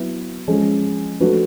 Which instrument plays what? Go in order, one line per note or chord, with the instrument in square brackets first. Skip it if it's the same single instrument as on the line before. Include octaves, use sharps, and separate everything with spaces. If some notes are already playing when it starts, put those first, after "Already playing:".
Already playing: [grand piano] F#3 B3 E4
F3 G#3 C#4
F3 A3 D4 F#4 B4